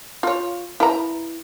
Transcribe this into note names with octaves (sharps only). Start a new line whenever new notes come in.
F4 C#5
E4 B4 A#5